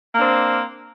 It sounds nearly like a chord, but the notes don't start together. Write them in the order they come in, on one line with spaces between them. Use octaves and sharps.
A#3 D4 C4